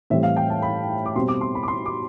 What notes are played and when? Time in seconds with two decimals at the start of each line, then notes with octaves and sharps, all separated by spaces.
0.10 A2 E3 G3 C4 E5
0.23 F5
0.37 G5
0.50 A5
0.62 B5
1.06 D6
1.15 B2 G3 C4 C6
1.28 D6
1.41 C6
1.55 B5
1.63 D6
1.68 C6
1.86 D6